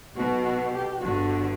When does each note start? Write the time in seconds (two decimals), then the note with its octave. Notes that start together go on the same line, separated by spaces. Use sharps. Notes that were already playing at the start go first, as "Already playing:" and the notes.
0.15 B1 B2 F#4
0.43 F#4
0.72 G4
1.00 G1 G2 D3 F#4